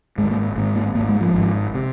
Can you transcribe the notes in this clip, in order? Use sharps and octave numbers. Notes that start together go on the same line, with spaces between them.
G#1 G#2 G#3
A#3
G#1 G#2
A#3
G#1 G#2 A#3
G#3
F3
G#1 G#2
C3